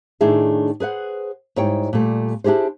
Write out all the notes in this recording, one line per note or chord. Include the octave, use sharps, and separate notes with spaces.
A2 D#3 D4 E4 G#4 E5
G#4 B4 C5 F#5
G#2 G3 E4 C#5 G5
A#2 G3 A3
D4 E4 G4 G#4 C5